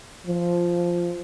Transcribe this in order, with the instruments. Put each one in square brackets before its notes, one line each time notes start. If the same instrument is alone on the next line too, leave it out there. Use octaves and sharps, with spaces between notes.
[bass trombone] F3